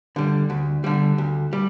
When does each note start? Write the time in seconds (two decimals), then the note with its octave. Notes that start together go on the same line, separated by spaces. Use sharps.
0.16 D3 G3
0.50 D2
0.84 D3 G3
1.18 D2
1.53 G3